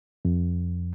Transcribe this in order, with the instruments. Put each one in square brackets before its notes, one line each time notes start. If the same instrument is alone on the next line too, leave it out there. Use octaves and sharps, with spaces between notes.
[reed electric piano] F2